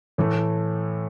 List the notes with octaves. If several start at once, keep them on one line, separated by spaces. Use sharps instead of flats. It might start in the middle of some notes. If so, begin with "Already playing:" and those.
A2 E3 A3